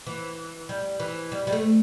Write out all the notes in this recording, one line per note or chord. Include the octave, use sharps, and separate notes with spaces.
E3
G3
E3
G3
G3
A3